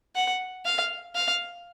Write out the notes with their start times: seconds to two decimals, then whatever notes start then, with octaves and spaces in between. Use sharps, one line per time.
0.15 F#5
0.65 F5
1.15 F5